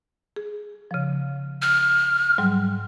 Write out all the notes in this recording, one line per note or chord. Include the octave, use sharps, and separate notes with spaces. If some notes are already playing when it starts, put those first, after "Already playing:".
G#4
C#3 F3
F6
G#2 F#3 G3